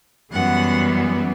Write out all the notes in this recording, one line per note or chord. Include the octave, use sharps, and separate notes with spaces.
F#2 E3 G3 B3 F#5